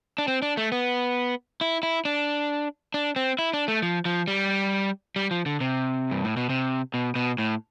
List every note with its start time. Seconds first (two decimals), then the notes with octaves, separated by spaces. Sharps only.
0.18 D4
0.28 C4
0.42 D4
0.57 A3
0.72 B3
1.61 E4
1.83 E4
2.05 D4
2.94 D4
3.16 C4
3.39 E4
3.53 D4
3.68 A3
3.82 F3
4.05 F3
4.28 G3
5.16 G3
5.31 F3
5.46 D3
5.61 C3
6.11 G2
6.24 A2
6.37 B2
6.49 C3
6.94 B2
7.15 B2
7.38 A2